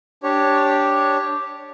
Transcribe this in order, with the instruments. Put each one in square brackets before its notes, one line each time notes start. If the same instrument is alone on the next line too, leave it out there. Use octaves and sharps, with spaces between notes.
[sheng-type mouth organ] D4 G4 C#5